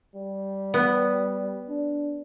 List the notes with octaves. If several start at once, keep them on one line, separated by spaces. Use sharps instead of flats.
G3
B3
D4